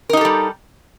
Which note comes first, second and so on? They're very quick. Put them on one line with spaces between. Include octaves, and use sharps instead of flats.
A#4 D#4 G4 A4 G3